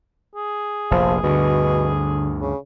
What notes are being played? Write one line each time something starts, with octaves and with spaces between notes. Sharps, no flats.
G#4
F1 A#1 F3
D2 G2 B2 D3
C#3